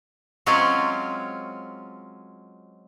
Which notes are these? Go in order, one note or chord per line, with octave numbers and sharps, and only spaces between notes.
F#3 G#3 C4 C#4 F4